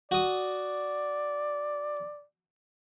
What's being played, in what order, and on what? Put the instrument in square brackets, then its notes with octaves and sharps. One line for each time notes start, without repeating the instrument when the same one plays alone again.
[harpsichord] F#4 D#6 [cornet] D5